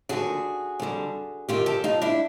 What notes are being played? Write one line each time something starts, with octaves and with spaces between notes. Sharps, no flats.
D#2 D3 F3 F#4 G#4
F2 D3 G3
E2 C3 D#3 F4 G4
G4 A4
D#4 F4
D4 E4